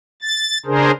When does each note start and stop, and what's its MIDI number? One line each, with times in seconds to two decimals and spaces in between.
0.22 0.58 93
0.66 0.91 49
0.66 0.91 62
0.66 0.91 68
0.66 0.91 70
0.66 0.91 72